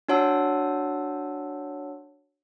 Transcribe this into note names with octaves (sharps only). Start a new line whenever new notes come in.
D4 F#4 C#5 F#5 A5 E6